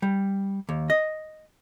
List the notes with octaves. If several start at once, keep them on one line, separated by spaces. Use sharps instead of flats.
G3
D#2
D#5